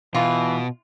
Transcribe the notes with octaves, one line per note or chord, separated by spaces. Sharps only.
B2 E3 F4